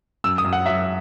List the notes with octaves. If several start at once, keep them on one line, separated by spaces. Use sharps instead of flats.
F#2 E6
D#6
F#2
F#5
F#3 E5